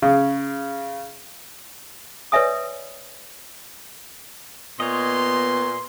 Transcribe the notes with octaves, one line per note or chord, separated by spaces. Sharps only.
C#3
B4 C#5 D5 E5 G#5 D#6
A#2 B3 C#5 D#5 C6